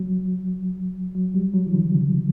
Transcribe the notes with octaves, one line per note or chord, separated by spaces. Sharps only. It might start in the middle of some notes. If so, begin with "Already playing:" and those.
Already playing: F#3
F#3
G3
F#3
E3
D3
C#3